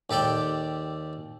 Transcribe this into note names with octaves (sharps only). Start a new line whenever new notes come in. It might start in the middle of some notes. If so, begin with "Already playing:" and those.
D#2 G4 A4 D5 G5